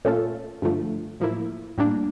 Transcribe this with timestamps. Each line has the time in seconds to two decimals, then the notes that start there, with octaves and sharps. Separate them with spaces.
0.05 A#2 A3 C#4 F4 A4
0.62 G2 D3 F3 A3
1.20 A2 F3 A#3 E4
1.78 A2 G3 A#3 D4